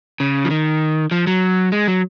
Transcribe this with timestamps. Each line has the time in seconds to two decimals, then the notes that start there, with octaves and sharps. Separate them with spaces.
0.20 C#3
0.45 F3
0.50 D#3
1.11 F3
1.27 F#3
1.72 G#3
1.87 F#3